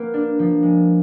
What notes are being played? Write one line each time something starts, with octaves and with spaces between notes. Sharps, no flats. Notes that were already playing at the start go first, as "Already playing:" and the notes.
Already playing: A#3 B3
D4
F3
G#3